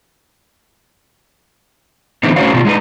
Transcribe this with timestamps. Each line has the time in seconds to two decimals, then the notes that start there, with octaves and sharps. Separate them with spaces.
2.23 D3 E3 A3 B3 C4 D#4
2.36 A3 C#4 F#4 C5 C#5 F5
2.54 B2 D#3 F4
2.65 G#3 D#4 B4